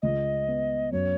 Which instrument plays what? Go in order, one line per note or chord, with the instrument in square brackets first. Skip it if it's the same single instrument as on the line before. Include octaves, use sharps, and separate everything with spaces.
[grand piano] C#2 [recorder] D#5
[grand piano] B3
[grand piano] F#2 [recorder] C#5